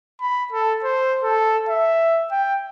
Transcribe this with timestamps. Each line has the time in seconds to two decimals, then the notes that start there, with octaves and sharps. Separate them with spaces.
0.21 B5
0.53 A4
0.84 C5
1.23 A4
1.69 E5
2.31 G5